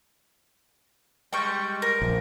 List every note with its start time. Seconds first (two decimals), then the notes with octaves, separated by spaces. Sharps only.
1.33 G3 G#3 G5 C#6
1.82 A#4
2.02 A#1